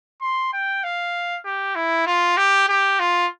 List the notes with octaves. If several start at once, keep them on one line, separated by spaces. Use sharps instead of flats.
C6
G5
F5
G4
E4
F4
G4
G4
F4